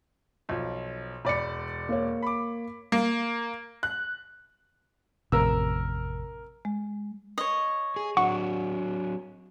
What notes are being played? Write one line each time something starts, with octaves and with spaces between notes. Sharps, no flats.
B1 F3
E1 D5 B5 C#7
A#3 C#5
B5 D6
A#3
F#6
A1 F2 C3 A#4 E6
G#3
C#5 D#5
G#4
F#3 D4 F#5 C#6